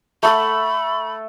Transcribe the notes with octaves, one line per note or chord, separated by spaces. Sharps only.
A3 A4 B5